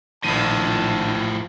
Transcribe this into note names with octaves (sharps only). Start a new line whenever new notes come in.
A#1 A2 D#3 F3 A5 D#7